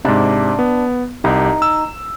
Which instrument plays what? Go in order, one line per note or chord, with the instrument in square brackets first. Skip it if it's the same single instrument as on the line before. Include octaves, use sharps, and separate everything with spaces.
[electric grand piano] G#2 C3 [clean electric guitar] D4
[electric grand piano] B3
[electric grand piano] C2 G4 [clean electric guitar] D#4
[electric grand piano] E6